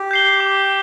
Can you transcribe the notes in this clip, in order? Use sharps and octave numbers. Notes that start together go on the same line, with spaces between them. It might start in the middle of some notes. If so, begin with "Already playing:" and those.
Already playing: G4
G6 C7 G7
D6